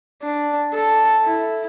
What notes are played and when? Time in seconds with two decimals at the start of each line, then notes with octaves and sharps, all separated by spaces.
0.22 D4
0.74 A4
1.25 E4